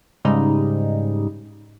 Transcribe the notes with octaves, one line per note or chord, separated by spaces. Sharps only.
G#2 C#3 G3 D#4